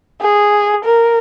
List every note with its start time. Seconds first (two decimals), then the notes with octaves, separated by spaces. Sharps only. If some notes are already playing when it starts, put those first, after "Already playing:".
0.21 G#4
0.85 A#4